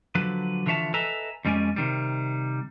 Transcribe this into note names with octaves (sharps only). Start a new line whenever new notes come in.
D3 F3 F#3 B4
D3 E3 F3 C#5 E5 A5
A4 B4 D#5 E5 G#5 A#5
F2 G3 G#3 C#4 D5 G#5
C3 D#3 G3